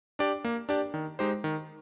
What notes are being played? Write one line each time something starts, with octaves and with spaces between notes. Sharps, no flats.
D4 G4 D5
A#3
D4 G4 D5
D#3
G#3 D#4 G4 C5
D#3